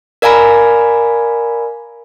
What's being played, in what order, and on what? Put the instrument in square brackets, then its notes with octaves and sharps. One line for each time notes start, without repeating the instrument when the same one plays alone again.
[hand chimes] A#4 D5 F5 G#5 A#5 B5